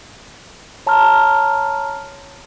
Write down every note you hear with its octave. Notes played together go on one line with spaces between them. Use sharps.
C#5 A5 A#5 C6 F6